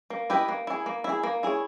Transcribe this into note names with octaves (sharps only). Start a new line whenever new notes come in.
A#3
E4 G4 B4 D#5
A#3
E4 G#4
A#3
E4 G#4
A#3
E4 G#4 C#5